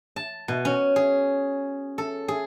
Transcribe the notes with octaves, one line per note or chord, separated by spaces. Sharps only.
A5
B2
C#4
G#4
A4
G#4